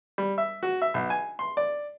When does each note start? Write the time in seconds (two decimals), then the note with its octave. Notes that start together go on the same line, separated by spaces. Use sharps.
0.18 G3
0.38 E5
0.63 F#4
0.82 E5
0.94 B1
1.10 G#5
1.39 C6
1.57 D5